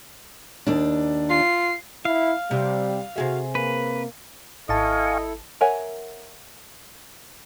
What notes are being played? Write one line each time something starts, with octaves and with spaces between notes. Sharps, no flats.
D#2 D4
F4 C7
E4 F5
C3 G3 G4
C3 F#4 G#4 E5
A#3 B4
G#1 E4 A4 D#5 F5 G#5 A5 C#6
A#4 C#5 E5 F#5 G#5